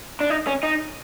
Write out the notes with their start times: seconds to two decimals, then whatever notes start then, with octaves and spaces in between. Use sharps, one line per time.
0.20 D4
0.30 D#4
0.47 C#4
0.63 D#4